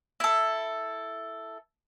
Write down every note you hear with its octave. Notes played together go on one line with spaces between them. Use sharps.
E4 A4